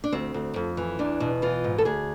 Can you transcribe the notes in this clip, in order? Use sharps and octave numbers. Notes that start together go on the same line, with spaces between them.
D4
D2 C4
D2
F2
E3
E2 D4
B2
E3 F4
G#2
A4
D2 G#4